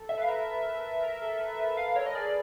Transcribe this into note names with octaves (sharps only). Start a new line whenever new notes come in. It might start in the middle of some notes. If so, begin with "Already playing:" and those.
Already playing: A4
E5
B4 F5
A#4 E5
A#4
A4
B4
B4
B4 F5
A#4 C#5
D#5
G#4 D5
G#4